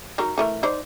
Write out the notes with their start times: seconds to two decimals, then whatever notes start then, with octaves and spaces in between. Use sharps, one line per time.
0.18 F#3 D#4 A#4
0.38 E3 A3 A#4
0.63 D#4 C5 D5